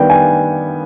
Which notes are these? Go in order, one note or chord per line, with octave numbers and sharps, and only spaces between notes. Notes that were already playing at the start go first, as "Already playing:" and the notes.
Already playing: D#3 G3 B3 D4 G5
G#5